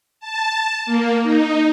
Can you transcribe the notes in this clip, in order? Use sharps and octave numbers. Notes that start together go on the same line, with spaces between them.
A5
A#3
D#4